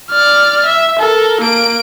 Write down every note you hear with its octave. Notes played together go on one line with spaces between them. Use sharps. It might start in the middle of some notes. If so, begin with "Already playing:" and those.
D5 F6
E5
A4 A#4
A#3 D7